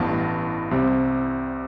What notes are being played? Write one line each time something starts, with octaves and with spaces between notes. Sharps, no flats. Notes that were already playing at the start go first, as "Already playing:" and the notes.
Already playing: A1 G2 E3 B3 F5 A5
C2 C3 G3 C4